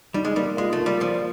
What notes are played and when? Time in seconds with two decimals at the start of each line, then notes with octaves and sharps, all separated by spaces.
0.14 G3 D#4
0.25 G#3
0.36 G3 A#3
0.57 G#3 F4
0.73 A3
0.80 A#3
0.86 G3
1.01 F3 F4